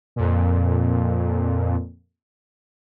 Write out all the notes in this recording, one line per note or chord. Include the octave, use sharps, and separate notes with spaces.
F2 A#2